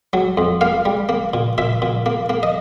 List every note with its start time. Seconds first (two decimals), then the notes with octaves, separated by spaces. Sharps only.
0.13 F#3
0.37 F2
0.61 A#3 F5
0.85 G3
1.09 A#3
1.34 A#2
1.58 A#2 E5
1.82 A#2
2.06 A#3
2.30 A#3
2.43 D#5